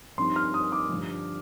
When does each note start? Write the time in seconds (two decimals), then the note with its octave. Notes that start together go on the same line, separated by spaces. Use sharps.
0.18 G2 F3 C4 D#4 C6
0.36 F6
0.54 D#6
0.72 D6
0.89 G2 D3 F3